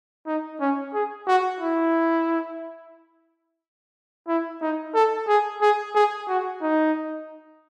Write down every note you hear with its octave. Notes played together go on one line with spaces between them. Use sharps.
D#4
C#4
G#4
F#4
E4
E4
D#4
A4
G#4
G#4
G#4
F#4
D#4